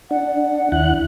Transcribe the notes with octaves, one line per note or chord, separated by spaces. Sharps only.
D4 F#5
D#2 E4 F#6